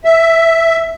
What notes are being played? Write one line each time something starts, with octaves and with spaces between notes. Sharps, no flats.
E5